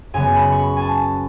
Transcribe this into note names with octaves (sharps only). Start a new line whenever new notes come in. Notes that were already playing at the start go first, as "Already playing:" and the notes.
F#2 C#3 F#3 B3 G#5
B5
C#6
B5
G#5
A5